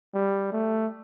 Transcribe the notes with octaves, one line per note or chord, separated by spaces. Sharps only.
G3
A3